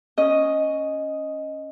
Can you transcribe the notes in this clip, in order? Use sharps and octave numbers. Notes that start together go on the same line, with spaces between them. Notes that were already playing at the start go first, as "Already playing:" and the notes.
C#4 D#5